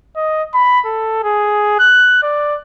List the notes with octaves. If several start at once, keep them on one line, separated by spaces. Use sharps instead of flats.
D#5
B5
A4
G#4
F#6
D5